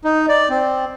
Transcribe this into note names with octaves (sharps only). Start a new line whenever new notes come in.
D#4
D5
C4